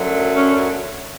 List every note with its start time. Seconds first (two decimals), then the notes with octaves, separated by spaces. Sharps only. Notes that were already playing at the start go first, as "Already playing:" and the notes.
Already playing: F#2 D3 F#3 A3
0.34 C#4